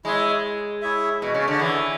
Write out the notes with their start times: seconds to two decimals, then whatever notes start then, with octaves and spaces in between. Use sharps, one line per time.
0.05 G#3 E4 G#4 C#5 E5
0.82 E4 G#4 C#5 E5
1.22 B2
1.34 C#3
1.48 D3
1.59 E3 E4 G#4 C#5 E5